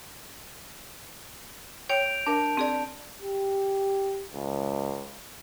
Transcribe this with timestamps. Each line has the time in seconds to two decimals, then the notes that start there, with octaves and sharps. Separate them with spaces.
1.90 C#5 G5 G6 D7 F7
2.26 D4 A#4 A5
2.57 C4 G#4 D5
3.22 G4
4.34 C#2